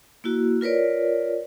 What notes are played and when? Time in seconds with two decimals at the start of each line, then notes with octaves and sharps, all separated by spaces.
0.24 A#3 E4 F#4
0.61 F4 A#4 B4 C#5 D5